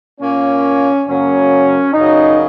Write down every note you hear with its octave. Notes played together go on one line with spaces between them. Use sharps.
A#2 A#3 C#4
F#2 C#3 F#3 A#3 C#4
F#2 C#3 F#3 D#4